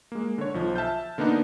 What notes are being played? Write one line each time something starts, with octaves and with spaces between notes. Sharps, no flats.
G#3 A#3
D3 C#5
B1 F3
E5 A5 F6 G6
D3 A#3 B3 D4 D#4